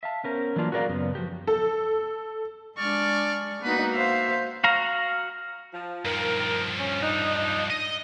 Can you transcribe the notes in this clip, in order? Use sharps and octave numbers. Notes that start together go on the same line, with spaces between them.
E5 F5 A5
B3 C#4 A#4 C5
D3 E3 F#3 A#3 D4 F4
F#4 G#4 A#4 C#5 D5 F5
F#2 C#3 B3
F3 F#4 G4
A4
G#3 D4 D5 C#6 F6
A#3 B3 D#4 F#4 B4
C5 E5 F5
F#4 F5 A#5
F3
G2 D#3 F3 A#4
C#4
D4 D#4
D#5